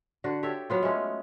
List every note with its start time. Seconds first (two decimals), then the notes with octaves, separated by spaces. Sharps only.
0.24 D3 F#4
0.43 G4 A4 C#5 E5
0.70 F#3 B3 F4
0.83 G#3 A3 C#4